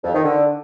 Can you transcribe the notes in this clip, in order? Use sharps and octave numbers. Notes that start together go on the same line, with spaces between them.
F2
D#3
D3